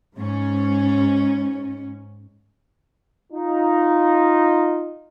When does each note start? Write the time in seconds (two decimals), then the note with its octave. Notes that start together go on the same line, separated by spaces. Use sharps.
0.17 G#2 C#4
3.32 D#4 F4